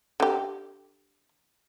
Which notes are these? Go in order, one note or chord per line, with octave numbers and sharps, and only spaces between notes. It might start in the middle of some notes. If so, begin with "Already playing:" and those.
D3 G4